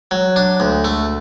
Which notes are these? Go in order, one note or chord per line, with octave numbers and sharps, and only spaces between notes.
F#3
D4
D2
A3